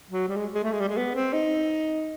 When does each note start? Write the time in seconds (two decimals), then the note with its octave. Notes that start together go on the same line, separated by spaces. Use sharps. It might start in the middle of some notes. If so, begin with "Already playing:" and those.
0.10 F#3
0.28 G3
0.37 G#3
0.54 G#3
0.63 A3
0.72 G#3
0.81 G3
0.89 G#3
0.97 B3
1.15 C4
1.33 D#4